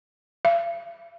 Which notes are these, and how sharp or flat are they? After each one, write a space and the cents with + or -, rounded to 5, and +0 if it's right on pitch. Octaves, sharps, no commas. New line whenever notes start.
F5 -45